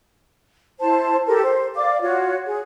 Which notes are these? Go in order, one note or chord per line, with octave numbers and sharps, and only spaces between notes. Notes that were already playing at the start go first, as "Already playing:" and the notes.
E4 C5 A5
G4 A4 A#4
C5
D5 F5 D6
F4 F#4 C#5
G#4